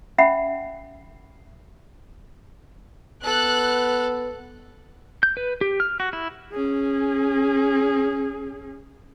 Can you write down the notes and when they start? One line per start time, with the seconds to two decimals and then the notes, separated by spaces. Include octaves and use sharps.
0.18 C#4 E5 F#5 G5 B5
3.24 B3 A4 F#6
5.23 G6
5.37 B4
5.61 G4
5.80 F6
6.00 F#4
6.13 E4
6.52 C#4 G#4